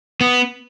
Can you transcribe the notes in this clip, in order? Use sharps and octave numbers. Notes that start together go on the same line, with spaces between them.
B3